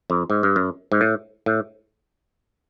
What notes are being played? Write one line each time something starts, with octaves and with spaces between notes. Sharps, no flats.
F2
G#2
G2
F#2
G#2
A2
A2